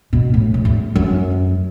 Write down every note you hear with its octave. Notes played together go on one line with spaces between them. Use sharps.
B2
A2
F#2
E2
F#2